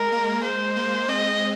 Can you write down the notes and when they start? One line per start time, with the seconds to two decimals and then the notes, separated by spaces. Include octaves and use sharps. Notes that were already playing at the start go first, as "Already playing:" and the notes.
Already playing: G#3 A#4
0.12 A#3
0.44 G#3 C5
0.76 A#3
1.08 G#3 C4 D#5